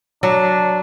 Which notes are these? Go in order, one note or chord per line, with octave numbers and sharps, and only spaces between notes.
F#3 D4